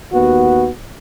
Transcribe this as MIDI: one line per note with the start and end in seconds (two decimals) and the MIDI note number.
0.13 0.68 39
0.13 0.68 59
0.13 0.68 66